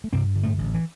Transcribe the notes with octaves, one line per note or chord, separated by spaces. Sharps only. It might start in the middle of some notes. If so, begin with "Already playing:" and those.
A3
G2 C3 C4
D3
A2 A3
A1
E3